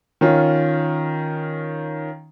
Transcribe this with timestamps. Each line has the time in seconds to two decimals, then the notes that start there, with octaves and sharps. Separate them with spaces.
0.21 D#3 C#4 F4